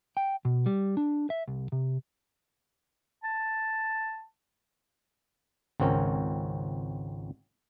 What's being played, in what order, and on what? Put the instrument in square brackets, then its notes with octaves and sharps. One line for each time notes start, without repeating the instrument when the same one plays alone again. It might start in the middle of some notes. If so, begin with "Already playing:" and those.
[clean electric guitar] G5
B2
G3
D4
E5
C2
C3
[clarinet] A5
[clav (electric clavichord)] G#1 C#2 C4 C#4 A#4